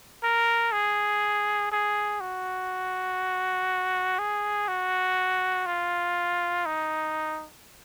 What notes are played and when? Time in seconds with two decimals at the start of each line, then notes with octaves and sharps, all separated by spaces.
0.23 A#4
0.72 G#4
1.72 G#4
2.21 F#4
4.19 G#4
4.68 F#4
5.66 F4
6.66 D#4